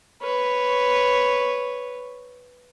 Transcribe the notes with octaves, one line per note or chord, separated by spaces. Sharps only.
B4 C#5